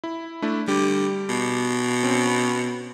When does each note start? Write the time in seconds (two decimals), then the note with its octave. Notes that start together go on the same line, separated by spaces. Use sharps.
0.04 E4
0.42 A3 D4 E4
0.68 D3 G3 G4
1.30 B2
2.03 C4 C#4